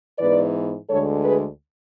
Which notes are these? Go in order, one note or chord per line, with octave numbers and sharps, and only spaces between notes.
G#2 E3 B3 B4 D5
D2 D3 G#3 A4 C#5
G#4 B4